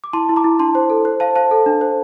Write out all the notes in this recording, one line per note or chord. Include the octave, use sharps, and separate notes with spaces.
D6
E4 A5 C6
E4
A#5 D6
E4
D4 A5 C6
C5
A4
C5
C5 F5 A5
C5 F5 A5
A4
D4
C5